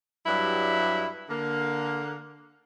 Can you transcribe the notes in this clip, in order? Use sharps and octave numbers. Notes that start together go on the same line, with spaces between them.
G2 F#3 G3 E4
D3 A#3